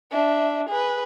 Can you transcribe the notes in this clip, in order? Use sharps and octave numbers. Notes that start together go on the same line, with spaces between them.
D4 E5
G#4 B4